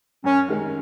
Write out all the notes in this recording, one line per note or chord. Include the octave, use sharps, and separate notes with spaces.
F#2 C#4
D#3 G#3 C#4